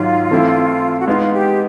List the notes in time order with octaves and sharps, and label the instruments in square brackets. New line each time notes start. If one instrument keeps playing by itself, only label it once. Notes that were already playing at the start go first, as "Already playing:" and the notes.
Already playing: [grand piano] G#2 D#3 F#3 [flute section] F4
[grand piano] E3 A3 C4 E4
[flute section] F#4
[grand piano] G#3 B3 D#4 [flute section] F4
[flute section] G4